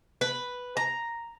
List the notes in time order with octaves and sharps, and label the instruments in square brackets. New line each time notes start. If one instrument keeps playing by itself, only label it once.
[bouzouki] B4
A#5